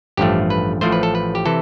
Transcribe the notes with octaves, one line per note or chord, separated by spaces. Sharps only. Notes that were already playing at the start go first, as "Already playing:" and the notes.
A1 G2 F3 A3 G4
B4
A1 A2 F3 A3 C5
B4
A4
B4
G4
C3 E3 A4